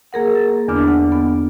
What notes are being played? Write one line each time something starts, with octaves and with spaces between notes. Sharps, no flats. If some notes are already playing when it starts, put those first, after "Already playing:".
A#3 G#4 A#4 F#5
A6
E2 D3 B3 D4 D6 F6
F#5
B3